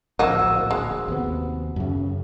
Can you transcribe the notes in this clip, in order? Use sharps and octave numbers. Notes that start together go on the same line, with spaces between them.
D1 A#1 F3 A#3 F4 F#4 D#5 E6
G#3
D#2 C3 B3
F#2 C#3